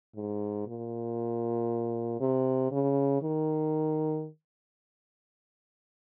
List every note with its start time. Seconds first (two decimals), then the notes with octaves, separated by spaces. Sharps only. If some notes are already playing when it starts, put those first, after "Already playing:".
0.16 G#2
0.67 A#2
2.20 C3
2.71 C#3
3.22 D#3